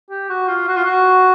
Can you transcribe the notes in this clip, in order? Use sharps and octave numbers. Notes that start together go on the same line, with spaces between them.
G4
F#4
F4
F#4
F4
F#4